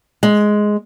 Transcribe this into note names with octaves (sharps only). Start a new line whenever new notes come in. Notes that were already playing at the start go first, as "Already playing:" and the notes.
G#3